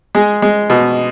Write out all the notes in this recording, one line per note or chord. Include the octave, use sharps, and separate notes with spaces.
G#3 G#4
G#3
B2